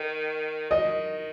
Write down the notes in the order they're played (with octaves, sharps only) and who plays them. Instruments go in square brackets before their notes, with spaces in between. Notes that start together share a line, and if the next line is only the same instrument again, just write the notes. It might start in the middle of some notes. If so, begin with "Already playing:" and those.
Already playing: [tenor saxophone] D#3
[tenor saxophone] D#3 [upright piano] D#5